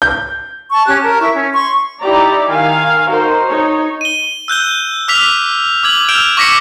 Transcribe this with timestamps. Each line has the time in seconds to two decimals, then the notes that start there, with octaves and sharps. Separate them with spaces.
0.02 G6
0.71 A5 C#6
0.87 C#4 G4 F#6
1.01 A#4 A5
1.20 E4 E5 C#6
1.34 C#4
1.53 C6 C#6
2.00 D#4 E4 G4 D5 A#5
2.49 D#3 F5 G#5
3.07 D#4 F#4 A#4 C5
3.46 D#4 C#5
4.01 D#7 G7
4.48 E6 F#6 G6 G7
5.08 D6 E6 F6 B6 F7
5.83 D6 E6 G#6 F#7
6.09 E6 F6 G6 D7 E7 F7
6.37 C#6 D6 A#6 B6 C#7